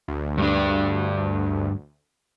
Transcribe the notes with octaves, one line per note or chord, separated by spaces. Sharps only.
D2
G2 D4